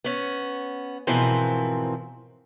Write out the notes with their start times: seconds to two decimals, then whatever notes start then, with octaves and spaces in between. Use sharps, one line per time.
0.04 B3 C#4
1.07 G#2 B2 E3 F3 C4 A#4